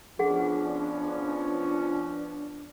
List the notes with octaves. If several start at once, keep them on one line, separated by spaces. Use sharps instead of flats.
F3 B3 C#4 D4 G#4 F#5